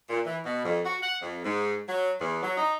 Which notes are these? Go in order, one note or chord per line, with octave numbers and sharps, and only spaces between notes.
A#2
E3
B2
F2
F#4
F#5
F2
G#2
F#3
E2
F#3
D#4